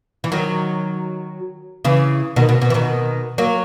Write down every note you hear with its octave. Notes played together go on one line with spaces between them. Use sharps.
E3
D#3 F#3
C#3 E3
B2 D#3
B2
B2
E3
B2 D#3
F#3 A#3